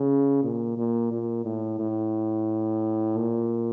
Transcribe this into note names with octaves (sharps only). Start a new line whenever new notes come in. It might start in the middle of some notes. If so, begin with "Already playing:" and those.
Already playing: C#3
A#2
A#2
A#2
A2
A2
A#2